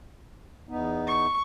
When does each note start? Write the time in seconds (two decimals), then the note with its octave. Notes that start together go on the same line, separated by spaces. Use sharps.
0.69 E2 B3 D#4
1.08 C#6